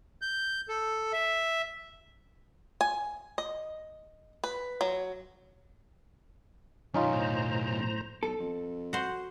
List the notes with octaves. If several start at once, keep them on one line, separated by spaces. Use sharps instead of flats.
G6
A4
E5
G#5
D#5
B4
F#3
F#2 B2 C#4 D#4 F4
A2 C5 A#5
B1 A4
F2
F#4 C5